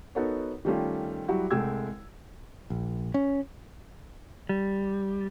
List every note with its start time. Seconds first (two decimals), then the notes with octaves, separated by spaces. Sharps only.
0.15 B3 D#4 F#4 A4 A#4 C#5
0.65 D#3 G3 A3 C#4 F4
1.28 F#3 G3 E4 F#4 G4
1.51 C2 G#3 A3 G5 E6 G#6
2.70 A#1
3.14 C#4
4.49 G3